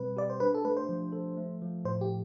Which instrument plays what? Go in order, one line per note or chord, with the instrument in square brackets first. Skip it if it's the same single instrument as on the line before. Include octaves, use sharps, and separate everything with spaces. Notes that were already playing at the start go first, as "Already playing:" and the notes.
Already playing: [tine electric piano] B2 G3 C4 [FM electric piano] B4
[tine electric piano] G4 [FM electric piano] D5
[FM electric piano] C5
[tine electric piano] D4 [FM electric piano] B4
[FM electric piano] A4
[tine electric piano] A3 [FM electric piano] B4
[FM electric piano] C5
[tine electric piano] F3
A4
A3
F3
[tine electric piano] A2 [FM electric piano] C5
[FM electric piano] G4